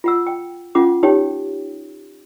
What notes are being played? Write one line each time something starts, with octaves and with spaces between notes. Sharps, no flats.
F4 F#5 E6
G5
C#4 F4 F#5 D6
D#4 G4 C#5 G5